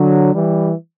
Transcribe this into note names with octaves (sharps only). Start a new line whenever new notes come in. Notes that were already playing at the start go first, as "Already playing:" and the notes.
Already playing: D3 F#3
E3 G3